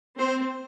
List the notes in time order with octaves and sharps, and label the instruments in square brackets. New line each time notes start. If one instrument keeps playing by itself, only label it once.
[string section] C4 [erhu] C5